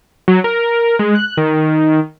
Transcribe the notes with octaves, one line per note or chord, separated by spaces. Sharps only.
F#3
A#4
G#3
F#6
D#3